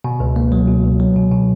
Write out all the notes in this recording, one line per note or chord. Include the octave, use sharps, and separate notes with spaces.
B2
C#2
A#3
F#3
B2
C#2
F#3
B2
B2